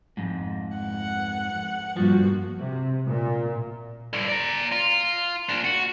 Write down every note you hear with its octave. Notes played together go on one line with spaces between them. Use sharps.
F2 G#2
F#5
G2 A#2 F3 F#4
C3
A#2
G2 D3
D5 A#5
F4
A#2 D4
F#4